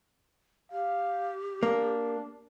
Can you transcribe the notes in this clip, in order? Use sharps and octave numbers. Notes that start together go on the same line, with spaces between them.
G4 F5
A#3 D4